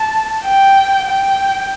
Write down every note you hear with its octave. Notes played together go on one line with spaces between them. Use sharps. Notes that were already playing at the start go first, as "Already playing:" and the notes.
Already playing: A5
G5
G5